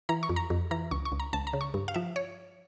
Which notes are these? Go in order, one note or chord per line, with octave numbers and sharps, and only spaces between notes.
E3 A#5
C#6
F2
A#5
F2
E3 A#5
C#2 C#6
C#6
C#2
A#5
C#2 A5
A#5
C#3
C#6
G2
F5
F3 E5
C#5